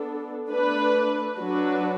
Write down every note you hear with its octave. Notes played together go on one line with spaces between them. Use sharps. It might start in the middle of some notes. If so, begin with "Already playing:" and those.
Already playing: B3 D4 A4
A3 D4 B4
F#3 D4 F#4 B4